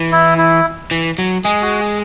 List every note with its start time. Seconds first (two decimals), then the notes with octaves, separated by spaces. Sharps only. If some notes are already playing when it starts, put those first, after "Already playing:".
Already playing: E3
0.12 E4
0.38 E4
0.91 E3
1.18 F#3
1.44 G#3 G#4
1.62 F#4
1.80 G#4